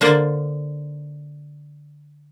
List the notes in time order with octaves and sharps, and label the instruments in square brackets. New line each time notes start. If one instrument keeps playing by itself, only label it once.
[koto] D3 A#3 C5 D5